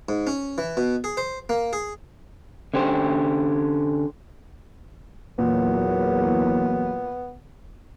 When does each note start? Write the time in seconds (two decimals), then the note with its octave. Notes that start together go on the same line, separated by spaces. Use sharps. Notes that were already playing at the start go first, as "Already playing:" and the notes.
0.09 G#2
0.27 C#4
0.58 E3
0.77 B2
1.04 G#4
1.17 C5
1.49 A#3
1.73 G#4
2.74 D3 C#4 G4 C5
5.39 E2 A#2 F#3 A#3 B3